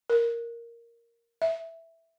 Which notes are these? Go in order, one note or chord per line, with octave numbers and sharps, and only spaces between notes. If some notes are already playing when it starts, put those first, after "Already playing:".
A#4
E5